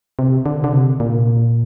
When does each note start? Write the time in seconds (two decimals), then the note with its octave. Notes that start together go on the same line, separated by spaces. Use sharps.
0.19 C3
0.46 D3
0.64 D3
0.73 C3
1.00 A#2